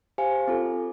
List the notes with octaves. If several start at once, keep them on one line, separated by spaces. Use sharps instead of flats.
G4 C5 F5 G#5
C4 F4 A4